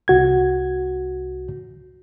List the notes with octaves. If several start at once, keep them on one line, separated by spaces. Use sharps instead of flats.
C2 F#4 G#6